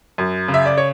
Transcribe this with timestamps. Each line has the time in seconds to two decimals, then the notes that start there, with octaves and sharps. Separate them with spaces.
0.18 F#2
0.48 C#3
0.54 E5
0.66 D5
0.78 C#5